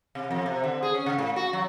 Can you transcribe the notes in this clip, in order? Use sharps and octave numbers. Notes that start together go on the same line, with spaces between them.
C3
F2
C3
D3
G#4
C#4
C#3
A2
F#4
F#3